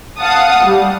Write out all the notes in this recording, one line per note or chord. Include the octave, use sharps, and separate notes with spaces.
F5 F#5 A5 D#6
G3